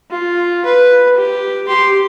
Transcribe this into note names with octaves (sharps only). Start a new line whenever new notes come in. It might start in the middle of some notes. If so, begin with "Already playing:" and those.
F4
B4
G4
G4 C6